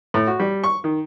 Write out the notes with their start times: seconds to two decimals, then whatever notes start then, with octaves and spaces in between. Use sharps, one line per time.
0.14 A2
0.27 F#4
0.39 G3
0.64 C#6
0.84 D#3